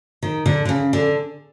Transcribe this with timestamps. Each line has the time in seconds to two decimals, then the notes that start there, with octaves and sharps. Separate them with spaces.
0.22 D#3
0.46 D3
0.65 D3
0.69 C#3
0.93 D3